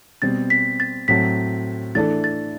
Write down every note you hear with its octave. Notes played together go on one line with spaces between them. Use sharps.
B2 G3 C4 A6
B6
A6
A2 F#3 C4 F#4 A4 B6
E3 A3 D4 A4 A6
A6